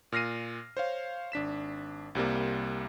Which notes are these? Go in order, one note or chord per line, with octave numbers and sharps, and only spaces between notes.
A#2 F6 A#6 C7 D#7
C5 C#5 F5
G#1 D4 B6 E7
C2 C3 G3 A#3